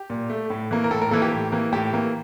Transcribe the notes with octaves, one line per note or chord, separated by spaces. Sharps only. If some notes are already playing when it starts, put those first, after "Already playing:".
Already playing: G4
A#2
A3
A2
E3 A#3
A#4
A2 A4
A#4
E3 A#3 A4
G4
A2
E3 A#3
A2 G4
E3 A#3